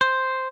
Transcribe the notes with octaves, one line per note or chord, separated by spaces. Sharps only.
C5